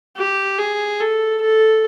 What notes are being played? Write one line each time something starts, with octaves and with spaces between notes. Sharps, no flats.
G4
G#4
A4
A4